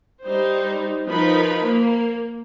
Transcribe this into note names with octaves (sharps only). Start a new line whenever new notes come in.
G3 D#4 C5
F3 D#4 A#4 B4 B5
A#3